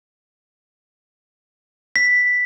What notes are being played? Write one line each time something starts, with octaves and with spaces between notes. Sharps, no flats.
B6